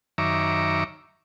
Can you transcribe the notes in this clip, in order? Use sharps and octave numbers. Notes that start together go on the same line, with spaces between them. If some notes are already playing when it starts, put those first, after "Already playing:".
F#2 D#3 C#5 E5 A#5 D6